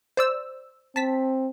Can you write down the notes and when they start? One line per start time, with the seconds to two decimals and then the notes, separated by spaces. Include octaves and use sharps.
0.17 C5 D5 E6
0.96 C4 A5 B6